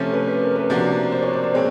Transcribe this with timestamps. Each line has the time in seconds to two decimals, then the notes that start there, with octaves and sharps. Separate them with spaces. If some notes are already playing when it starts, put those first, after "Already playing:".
Already playing: C3 F3 A3 C#4
0.14 B4
0.28 B4
0.42 A#4
0.56 B4
0.70 C3 F3 A#3 D4 F#4
1.12 C5
1.22 C#5
1.33 D5
1.44 C5
1.54 B2 G#3 C4 C#5